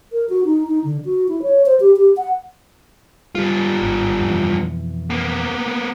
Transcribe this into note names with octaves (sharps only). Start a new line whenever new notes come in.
A#4
F#4
D#4
D#4
D3
F#4
E4
C#5
C5
G4
G4
F#5
G2 G3 F4
G#1
F2 B2 E3
A#3 B3